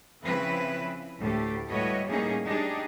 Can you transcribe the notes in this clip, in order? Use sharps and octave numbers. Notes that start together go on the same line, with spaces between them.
C#3 F3 C4 E4 B4
D2 A2 A3 G4
A2 G3 F#4 B4 C#5 D#5
A2 G3 A#3 C#4 D#4 G#4
D4 D#4 G4 G#4